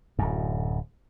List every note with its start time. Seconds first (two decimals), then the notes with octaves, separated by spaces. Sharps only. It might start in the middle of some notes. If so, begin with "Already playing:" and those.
0.19 D1 F#2